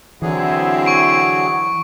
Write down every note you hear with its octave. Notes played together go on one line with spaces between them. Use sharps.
D3 E3 F#3 C4 E4 G#4
C#6 D7